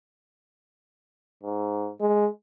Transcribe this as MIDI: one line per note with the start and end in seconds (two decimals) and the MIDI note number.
1.43 1.91 44
2.01 2.28 56